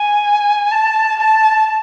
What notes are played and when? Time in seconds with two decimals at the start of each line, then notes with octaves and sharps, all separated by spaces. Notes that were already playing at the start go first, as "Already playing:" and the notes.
Already playing: G#5
0.72 A5
1.20 A5